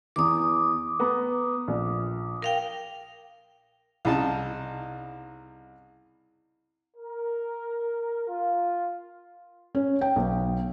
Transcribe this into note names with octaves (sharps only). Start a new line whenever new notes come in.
E2 E3 D6 D#6
B3 A#5
A#1
A#4 F5 G5
C2 C#3 D#4 A5
A#4
F4
C#4
G5
B1